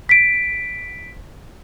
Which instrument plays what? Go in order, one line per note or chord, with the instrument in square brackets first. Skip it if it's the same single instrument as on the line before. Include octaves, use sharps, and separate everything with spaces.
[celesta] B6 D7